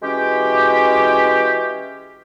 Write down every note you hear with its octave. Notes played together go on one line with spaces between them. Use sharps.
E3 G#3 C#4 F#4 G4